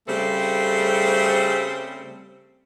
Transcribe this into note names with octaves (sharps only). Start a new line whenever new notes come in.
C#3 G3 A3 C4 G#4 A4